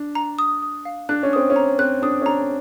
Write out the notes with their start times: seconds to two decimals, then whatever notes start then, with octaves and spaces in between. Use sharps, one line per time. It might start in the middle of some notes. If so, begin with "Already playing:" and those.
Already playing: D4
0.15 A#5
0.39 D#6
0.62 D#6
0.85 F5
1.09 D4 F#6
1.23 C#4
1.33 C4 D#6
1.50 C#4
1.56 A#5
1.79 C4 F#6
2.02 D4 D#6
2.21 C#4
2.26 D4 A#5